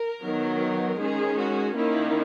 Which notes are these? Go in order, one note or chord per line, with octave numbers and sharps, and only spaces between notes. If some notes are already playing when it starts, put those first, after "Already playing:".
Already playing: A#4
D#3 F#3 B3
D#3 G#3 C#4 G#4
F#4
D#3 A#3 C#4 E4